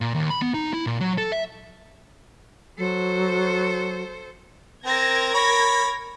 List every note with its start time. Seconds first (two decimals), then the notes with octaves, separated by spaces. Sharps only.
0.01 A#2
0.15 D#2
0.30 B5
0.42 B3
0.54 D#4
0.74 E4
0.86 A#2
1.01 F#3
1.18 A4
1.32 E5
2.78 F#3 A4 C5
4.85 C4 A#4 G#6 A#6
5.34 C#5 B5